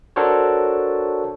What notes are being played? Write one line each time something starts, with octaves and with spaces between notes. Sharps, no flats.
D4 F#4 A4 A#4 C5 C#5